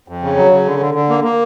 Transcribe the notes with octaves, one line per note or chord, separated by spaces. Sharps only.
F2
C#3
F#3
C#3
D3
D3
D3
A#3
A#3